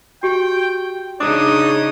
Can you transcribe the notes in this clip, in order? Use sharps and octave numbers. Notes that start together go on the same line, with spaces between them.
F#4 G4 G5
C#3 D4 D#4 C#5 D6 D#6